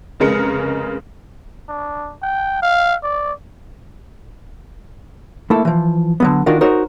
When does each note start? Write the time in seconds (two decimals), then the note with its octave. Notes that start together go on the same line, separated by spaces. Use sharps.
0.20 F1 C#3 G#3 A#4 C#7
1.69 D4
2.22 G5
2.62 F5
3.03 D5
5.50 A3 A#3 E4 A4
5.65 E3 F3
6.20 D3 F#3 B3
6.46 D#3 D4 D#4 F4 F#4 A#4
6.61 D#4 F#4 A#4 C5 C#5